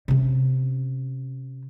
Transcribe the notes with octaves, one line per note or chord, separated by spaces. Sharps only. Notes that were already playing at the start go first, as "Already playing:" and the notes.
C3 C#4